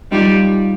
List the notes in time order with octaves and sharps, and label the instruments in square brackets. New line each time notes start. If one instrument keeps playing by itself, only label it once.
[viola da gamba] G3 [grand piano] D#4 F4